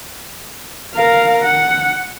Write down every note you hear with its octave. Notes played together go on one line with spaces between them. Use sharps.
A#4 F5
F#5